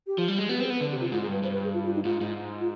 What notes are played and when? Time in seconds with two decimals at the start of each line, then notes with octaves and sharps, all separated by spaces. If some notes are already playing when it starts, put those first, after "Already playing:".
0.07 G4
0.18 F3 F4
0.28 G3
0.39 G#3
0.49 B3 G4
0.60 C4 B4
0.65 G#4
0.70 B3
0.81 D3 B4
0.91 G4
0.96 C3 F4
1.12 G#2 F4
1.22 G#4
1.27 G2 B4
1.43 G2 C5
1.53 B4
1.64 G#4
1.74 F4
1.85 F4
1.95 D#4
2.05 G#2 F4
2.21 G#2
2.60 F4